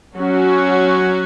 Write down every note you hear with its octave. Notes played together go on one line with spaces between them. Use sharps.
F#3 C#4 F#4